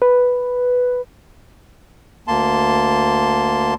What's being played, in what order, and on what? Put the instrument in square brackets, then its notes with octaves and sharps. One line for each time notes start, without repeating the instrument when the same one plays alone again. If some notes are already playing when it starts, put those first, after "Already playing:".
[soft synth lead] B4
[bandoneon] D2 A#3 A5 C6